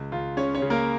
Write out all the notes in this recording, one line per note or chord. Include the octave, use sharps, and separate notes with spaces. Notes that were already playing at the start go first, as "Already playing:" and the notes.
Already playing: C#2
C#2 F4
C#3 C#4 C#5
C#4 C#5
C#3
A#3 A#4